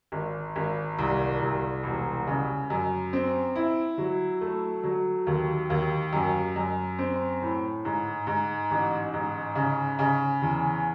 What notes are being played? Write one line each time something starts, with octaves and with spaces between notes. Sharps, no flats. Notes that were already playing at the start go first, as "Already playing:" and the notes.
G#1
G#1
C2
C2
E1
C#3
F#2
C4
E4
F#3
A3
F#3
D#2
D#2
F#2
F#2
C4
A2
G#2
G#2
A1
G#2
C#3
C#3
E2